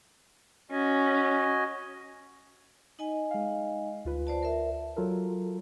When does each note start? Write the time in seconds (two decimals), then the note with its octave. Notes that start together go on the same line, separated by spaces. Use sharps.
0.71 C#4 F#4 D#5 G#5
2.99 D#4 D#5 G#5
3.31 G#3 F5
4.05 D2 F4 B4
4.27 C5 D5 A5
4.43 A#4 E5
4.97 F#3 F4 A4 A#4